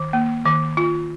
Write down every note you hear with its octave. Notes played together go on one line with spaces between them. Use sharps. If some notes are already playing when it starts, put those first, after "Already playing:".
Already playing: D#3
A#3
D#3
F4